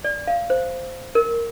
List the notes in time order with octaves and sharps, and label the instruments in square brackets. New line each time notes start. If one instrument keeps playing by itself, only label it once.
[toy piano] D5
F5
C5
A#4